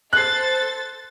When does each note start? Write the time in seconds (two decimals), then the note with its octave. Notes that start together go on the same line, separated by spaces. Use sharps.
0.13 A4 C5 F#6 A6 C7